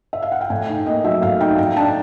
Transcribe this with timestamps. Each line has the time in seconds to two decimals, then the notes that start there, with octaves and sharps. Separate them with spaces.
0.13 E5
0.22 F5
0.32 F#5
0.41 G5
0.50 A2 G#5
0.68 D#4 G5
0.86 A#3 D#5
1.04 F#3 E5
1.22 A2 F5
1.40 D#4 G5
1.58 A2 G5
1.77 D4 A5